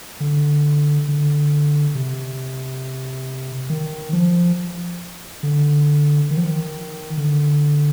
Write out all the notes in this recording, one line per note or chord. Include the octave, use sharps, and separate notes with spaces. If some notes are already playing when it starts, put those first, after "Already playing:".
D3
D3
C3
D#3
F3
D3
D#3
F3
D#3
D3